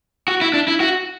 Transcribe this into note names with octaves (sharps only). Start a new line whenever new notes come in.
F#4
E4
D4
E4
F#4